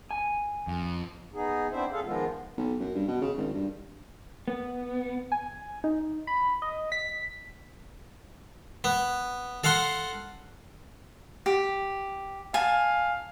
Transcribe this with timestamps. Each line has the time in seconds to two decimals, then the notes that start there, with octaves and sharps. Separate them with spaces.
0.11 G#5
0.67 F2
1.34 B3 D#4 G#4
1.72 B3 C4 D4 E4 C5 E5
1.92 F#2 G#4 A4 F5
2.04 D#3 F3 G#3 B3 F4
2.58 B1
2.80 F#2
2.95 G2
3.08 B2
3.21 C#3
3.38 G#1
3.54 G2
4.48 B3
5.32 G#5
5.84 D#4
6.27 B5
6.62 D#5
6.92 B6
8.84 B3
9.64 A4 F5 F#5 A#5 C6
11.46 G4
12.54 F5 G#5 A5